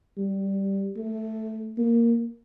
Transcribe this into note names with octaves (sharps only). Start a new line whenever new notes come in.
G3
A3
A#3